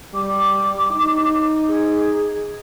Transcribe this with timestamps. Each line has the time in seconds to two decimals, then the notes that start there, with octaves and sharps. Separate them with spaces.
0.14 G3 D6
0.91 D#4
1.67 G#4